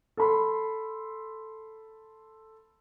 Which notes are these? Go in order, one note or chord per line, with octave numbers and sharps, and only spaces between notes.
A4 B5 C6